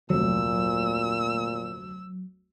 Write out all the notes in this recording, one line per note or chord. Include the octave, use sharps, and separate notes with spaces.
F1 D2 A#2 F#3 E6